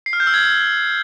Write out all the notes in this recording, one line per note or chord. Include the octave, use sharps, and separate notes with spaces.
C7
F6
G6
E6
G#6